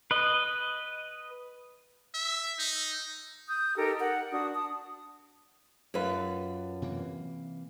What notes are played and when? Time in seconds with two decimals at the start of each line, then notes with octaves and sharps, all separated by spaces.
0.11 B4 D#5
2.14 E5
2.58 D#4
3.48 D#6 G6
3.76 D#4 G4 A4 A#4
3.99 A#4 F#5
4.31 D4 F#4 D#6
4.54 A5 D#6
5.94 F#2 F4 B4
6.82 C3 E3 A#3